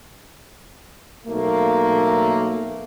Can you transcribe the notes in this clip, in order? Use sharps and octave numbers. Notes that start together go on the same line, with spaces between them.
B1 A3 A#3